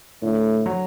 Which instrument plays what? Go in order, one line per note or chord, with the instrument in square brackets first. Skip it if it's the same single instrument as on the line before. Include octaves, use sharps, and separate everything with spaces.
[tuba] A2 [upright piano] D3
[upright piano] F#3